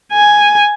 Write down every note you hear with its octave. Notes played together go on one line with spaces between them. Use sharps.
G#5